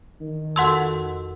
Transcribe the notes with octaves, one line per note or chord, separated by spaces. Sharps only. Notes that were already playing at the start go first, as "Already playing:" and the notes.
D#3
F2 F#4 A4 F#5 C6 E6